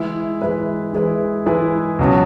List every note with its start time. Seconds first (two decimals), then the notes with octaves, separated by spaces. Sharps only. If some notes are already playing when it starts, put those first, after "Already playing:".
Already playing: E3 G#3 E4 G#4 B4
0.42 E3 G#3 E4 G#4 B4
0.93 E3 G#3 E4 G#4 B4
1.46 E3 G#3 E4 G#4 B4
1.99 C#2 B2 F#3 C#4